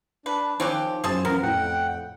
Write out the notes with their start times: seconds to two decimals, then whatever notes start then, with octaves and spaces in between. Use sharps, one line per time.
0.26 D4 B4
0.60 D#3 F3 C4 C#4 G4 F#6
1.04 F#2 G#4 C5 A5 D#6
1.25 A1 B3 A#4
1.43 F2 A2 F#5 G5